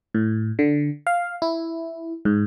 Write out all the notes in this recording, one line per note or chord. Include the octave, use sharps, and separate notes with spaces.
A2
D3
F5
E4
G#2